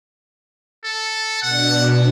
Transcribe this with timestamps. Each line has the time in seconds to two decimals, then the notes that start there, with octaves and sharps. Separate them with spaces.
0.85 A4
1.42 B2 D4 F#5